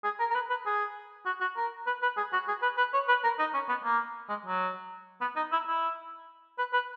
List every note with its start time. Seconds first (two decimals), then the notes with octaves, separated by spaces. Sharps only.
0.05 G#4
0.20 A#4
0.30 A#4
0.35 B4
0.50 B4
0.66 G#4
1.26 F#4
1.41 F#4
1.56 A#4
1.87 B4
2.02 B4
2.17 G#4
2.33 F#4
2.48 G#4
2.62 B4
2.78 B4
2.94 C#5
3.08 B4
3.24 A#4
3.39 D#4
3.54 C#4
3.69 B3
3.84 A#3
4.29 G#3
4.46 F#3
5.21 B3
5.36 D#4
5.52 E4
5.67 E4
6.58 B4
6.73 B4